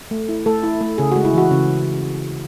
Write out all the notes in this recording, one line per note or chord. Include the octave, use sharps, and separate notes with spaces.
A3
E4
A3 A4
E4
A3
C#3 G#4
F#4
G#3
E4
E3 F#4
C#3